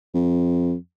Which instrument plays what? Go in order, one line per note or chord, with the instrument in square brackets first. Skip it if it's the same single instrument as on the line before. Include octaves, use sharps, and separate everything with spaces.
[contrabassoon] F2